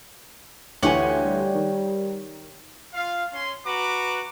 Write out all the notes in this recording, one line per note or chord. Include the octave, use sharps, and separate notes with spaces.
D2 E3 G4 C#5 F#5 G#5
G3
D#3
F4 F5
C#4 C6
F#4 B4 A#5 D6